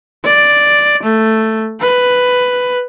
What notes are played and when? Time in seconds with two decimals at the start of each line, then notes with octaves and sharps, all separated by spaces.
0.24 D5
1.03 A3
1.80 B4